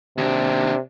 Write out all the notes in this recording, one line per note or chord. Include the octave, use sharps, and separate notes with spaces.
D#2 C3 D4